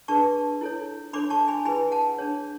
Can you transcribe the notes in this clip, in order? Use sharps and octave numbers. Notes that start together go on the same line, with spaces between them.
D4 G#4 B4 A5 C#6
E4 A4 C#5
D4 A4 C#5 B5 D6
A5 C#6
G#5 B5
E4 G#4 B4 G#5 B5
F#5 A5
D4 G#4 C#5